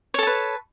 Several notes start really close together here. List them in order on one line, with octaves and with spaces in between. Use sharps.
C#5 A4 A5 B4